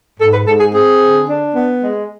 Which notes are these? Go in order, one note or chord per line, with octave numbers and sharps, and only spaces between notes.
G#2 A4
B4
G#2 A4
G#4
C4 G#4
D3
D4
B3
G#3